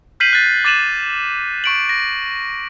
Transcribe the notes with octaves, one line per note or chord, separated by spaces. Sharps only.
F6 G6 B6 C7 D#7 F#7
F#6 A6
D6 A6 D#7 E7 F#7
C#6 D7 F#7
A#6